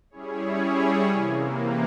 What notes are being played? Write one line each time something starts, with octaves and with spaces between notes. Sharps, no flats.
G3 C#4 E4 G#4 C#5
C3 E3 A#3